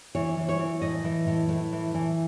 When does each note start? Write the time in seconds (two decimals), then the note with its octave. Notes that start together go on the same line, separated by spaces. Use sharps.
0.15 E3 C#5
0.37 E3
0.49 C#5
0.59 E3
0.81 A2 D#5
1.04 E3
1.27 A2
1.49 A2
1.72 E3
1.94 E3